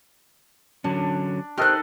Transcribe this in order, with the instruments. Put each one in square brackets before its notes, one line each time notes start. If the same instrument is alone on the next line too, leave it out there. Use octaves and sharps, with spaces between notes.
[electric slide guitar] D3 F#3 C#4 [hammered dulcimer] D4
[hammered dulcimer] D#3 D#4 A4 [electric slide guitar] G4 C5 [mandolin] F6 F#6